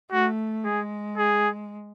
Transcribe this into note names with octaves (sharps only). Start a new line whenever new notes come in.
A3 F#4
G#3 G#4
G#4